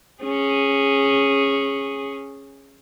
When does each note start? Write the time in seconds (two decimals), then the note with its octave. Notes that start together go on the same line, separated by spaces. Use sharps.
0.23 C#4 G#4